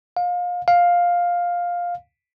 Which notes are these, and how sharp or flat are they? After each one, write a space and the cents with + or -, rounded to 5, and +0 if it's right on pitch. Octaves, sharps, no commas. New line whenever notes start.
F5 +30
F5 +10